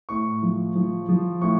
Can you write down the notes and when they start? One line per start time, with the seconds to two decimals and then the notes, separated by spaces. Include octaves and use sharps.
0.09 A2 C#6
0.42 F3
0.75 F3
1.08 F3
1.41 A2 C#6